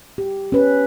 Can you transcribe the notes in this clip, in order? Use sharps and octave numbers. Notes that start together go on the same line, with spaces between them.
G4
C#4 B4